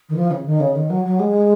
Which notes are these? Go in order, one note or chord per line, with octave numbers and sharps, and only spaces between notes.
D#3
F3
C#3
D#3
C#3
D#3
F#3
F#3
G#3